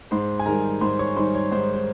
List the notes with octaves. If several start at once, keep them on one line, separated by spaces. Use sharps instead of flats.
G#2 C5 C6
G#5
D#3 G3 A#4 A#5
G#2 C5 C6
C#5 C#6
D#3 G3 C5 C6
C#5
G#2 C5
C5